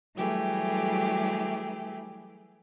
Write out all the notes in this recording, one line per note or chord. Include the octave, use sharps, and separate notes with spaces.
E3 F#3 G3 A3 G4 G#4